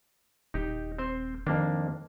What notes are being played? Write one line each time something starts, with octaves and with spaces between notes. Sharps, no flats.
D#1 D#4 G4
C4 C5
F2 D#3 A#3 D4